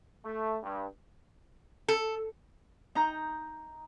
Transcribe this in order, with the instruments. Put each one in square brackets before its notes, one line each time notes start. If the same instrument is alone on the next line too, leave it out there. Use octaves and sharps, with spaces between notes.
[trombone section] A3
G2
[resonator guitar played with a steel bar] A4
[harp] D#4 A#5 G6